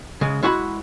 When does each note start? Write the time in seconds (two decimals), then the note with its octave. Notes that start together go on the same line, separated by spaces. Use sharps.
0.21 C#3 G#3
0.43 G#3 E4 F#4 F#5 B5